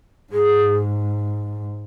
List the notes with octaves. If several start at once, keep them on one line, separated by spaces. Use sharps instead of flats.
G#2 G#4